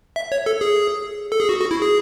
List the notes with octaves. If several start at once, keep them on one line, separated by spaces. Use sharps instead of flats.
E5
C#5
A4
G#4
A4
G#4
F#4
F#4
E4
G#4